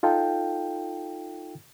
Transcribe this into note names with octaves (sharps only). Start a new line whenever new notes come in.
D#4 F4 A4 F5 G5